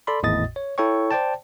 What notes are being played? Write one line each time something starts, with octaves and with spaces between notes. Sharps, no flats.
A4 D5 B5 C6
G#1 E2 A2 D#5 D#6 A6
C#5
E4 A4 C#5 G5 C#6
C5 D5 G5 A5